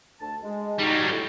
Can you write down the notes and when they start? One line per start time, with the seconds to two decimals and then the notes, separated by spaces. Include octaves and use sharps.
0.20 D2 A5
0.43 G#3
0.79 F#3 G3 D#4
1.08 D2 E4